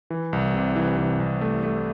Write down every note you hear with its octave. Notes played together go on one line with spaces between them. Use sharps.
E3
C2
C3
E3
E3
C2
A3
A3